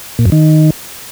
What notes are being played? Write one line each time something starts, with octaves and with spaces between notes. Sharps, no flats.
A#2
F#2
D#3